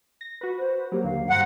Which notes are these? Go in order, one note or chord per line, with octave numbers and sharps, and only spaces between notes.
A#6
F#4 B4
C5
F#3 A#3 G4
D#2 D3 F5
G2 C5 F#5 A#5